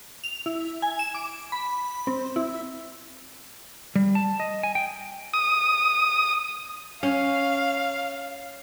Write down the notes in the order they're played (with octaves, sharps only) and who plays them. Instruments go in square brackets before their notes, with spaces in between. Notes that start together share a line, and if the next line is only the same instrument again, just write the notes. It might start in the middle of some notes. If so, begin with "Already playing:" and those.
[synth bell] F7
E4
G#5
E7
D6
B5
C4
E4
[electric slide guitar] G3
A5
D#5
G#5
G5
[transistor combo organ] D#6
[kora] C#4 [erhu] F5